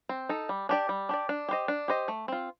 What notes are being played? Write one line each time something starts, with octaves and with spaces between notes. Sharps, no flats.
C4
D#4 A4
G3
D4 G4 D5
G3
D4 G4 D5
D4
G4 C5 D#5
D4
G4 C5 D#5
A3
C4 F4